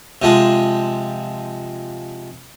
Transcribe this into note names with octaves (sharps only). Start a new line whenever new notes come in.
C3 F3 G#3